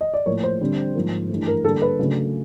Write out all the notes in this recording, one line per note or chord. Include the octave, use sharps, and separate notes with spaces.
D#5
D5
A2 F3 A#3 C#5
C5
D3 G3 C4
G#2 F3 A#3
G2 E3 A3
A#4
D3 G3 A#3 A4
B4
C#3 F#3 A3 D4